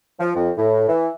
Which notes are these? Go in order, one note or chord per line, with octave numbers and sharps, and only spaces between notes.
F3
F2
A2
E3